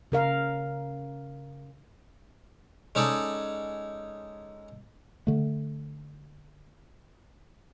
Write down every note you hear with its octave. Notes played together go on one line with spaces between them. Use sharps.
C#3 A#4 F5
G#3 C#4 D#4 A4 D5
D3 A3